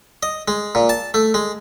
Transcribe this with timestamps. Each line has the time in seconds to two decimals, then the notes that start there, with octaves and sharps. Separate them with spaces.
0.23 D#5
0.48 G#3
0.75 A#2
0.89 A5
1.14 A3
1.34 G#3